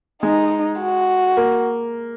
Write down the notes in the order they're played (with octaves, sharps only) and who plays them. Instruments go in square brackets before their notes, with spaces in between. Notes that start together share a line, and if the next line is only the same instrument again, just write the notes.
[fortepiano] G#3 [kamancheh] D#4
[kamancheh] F#4
[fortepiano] A#3